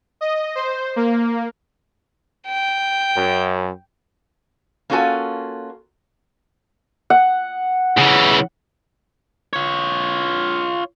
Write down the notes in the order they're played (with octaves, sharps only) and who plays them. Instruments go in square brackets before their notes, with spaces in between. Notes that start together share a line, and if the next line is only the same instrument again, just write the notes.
[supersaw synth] D#5
C5
A#3
[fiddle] G5
[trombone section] F#2
[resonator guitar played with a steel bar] A#3 C#4 F4 F#4 A4 G#5
[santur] F#5
[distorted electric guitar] C#3 E3
[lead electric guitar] F4 C#5